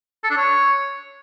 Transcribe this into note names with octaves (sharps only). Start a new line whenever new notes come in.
A4
D4
C#5